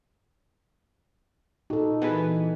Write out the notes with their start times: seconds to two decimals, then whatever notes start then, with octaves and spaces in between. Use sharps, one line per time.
1.70 A#2 D#4 F#4 G4 A4
2.02 E3 B3 G#4 B4